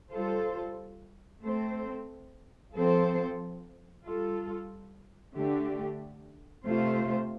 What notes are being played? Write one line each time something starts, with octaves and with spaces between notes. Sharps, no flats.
G3 F4 A4 C5
A3 C4 A4 C5
F3 C4 A4 C5
G3 F4 A4
D3 A3 D4 G4
C3 A3 F4 C5